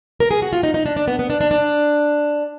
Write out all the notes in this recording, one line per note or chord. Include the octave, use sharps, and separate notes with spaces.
A#4
G#4
F#4
F4
D#4
D#4
D4
D4
B3
B3
D4
D4
D4